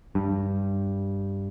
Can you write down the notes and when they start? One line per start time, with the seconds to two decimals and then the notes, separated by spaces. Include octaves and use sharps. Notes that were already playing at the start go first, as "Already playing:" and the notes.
0.15 G2